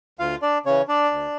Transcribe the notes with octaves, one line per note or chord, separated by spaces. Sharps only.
D2 F4 F5
D4 D5
C#3 E3 C#4 C#5
D4 D5
D2